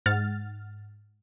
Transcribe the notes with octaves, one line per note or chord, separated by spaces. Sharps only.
G#2 F#5 F6 A6